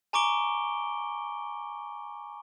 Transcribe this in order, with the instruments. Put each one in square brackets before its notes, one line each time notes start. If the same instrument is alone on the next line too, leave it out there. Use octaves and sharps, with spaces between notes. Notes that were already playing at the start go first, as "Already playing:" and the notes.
[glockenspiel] G#5 A#5 C#6 D6 D7 G7